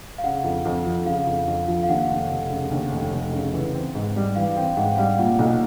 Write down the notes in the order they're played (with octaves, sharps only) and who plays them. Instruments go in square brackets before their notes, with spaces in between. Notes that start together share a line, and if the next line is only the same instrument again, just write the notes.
[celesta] F5
[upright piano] C#3 [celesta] F#5
[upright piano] F2
F2
F3
[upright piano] C#3 [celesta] F5
[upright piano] F2
F2
F3
[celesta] F5
[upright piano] D#2 [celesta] F#5
[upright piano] F1
F1
C#3
D#2
F1
F1
C#3
E3
C4
G#2
G3
[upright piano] E3 [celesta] F5
[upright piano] C4 [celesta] G5
[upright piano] G#2 [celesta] F#5
[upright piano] G3 [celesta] F5
[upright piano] A#2 [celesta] F#5
[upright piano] B1